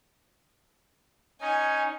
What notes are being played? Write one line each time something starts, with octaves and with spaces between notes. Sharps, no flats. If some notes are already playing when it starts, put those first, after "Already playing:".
C#4 D#4 G#5